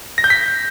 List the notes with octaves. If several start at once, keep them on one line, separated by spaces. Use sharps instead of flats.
A#6
G6
B6